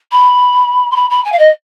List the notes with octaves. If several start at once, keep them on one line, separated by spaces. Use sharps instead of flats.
B5
C6
B5
B5
G#5
F5
D#5